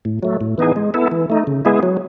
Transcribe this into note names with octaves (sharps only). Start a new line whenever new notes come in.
A2
F#3 A3
A2
E3 B3 D#4 G#4
G#3
B3 E4 A4
E3
A3 D#4
C#3
G#3 B3 E4 G#4
F#3